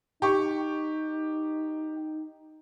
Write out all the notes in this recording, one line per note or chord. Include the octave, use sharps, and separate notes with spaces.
D#4 G4 C#6